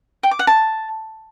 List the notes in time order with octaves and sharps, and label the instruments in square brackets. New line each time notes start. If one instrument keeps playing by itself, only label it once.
[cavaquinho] G5
D6
F#5
A5